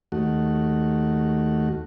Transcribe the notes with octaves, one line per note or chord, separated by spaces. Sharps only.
D#2 A3 F#4